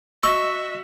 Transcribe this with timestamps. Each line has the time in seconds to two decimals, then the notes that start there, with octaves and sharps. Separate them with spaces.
0.23 F#4 D#5 E5 C#6 E6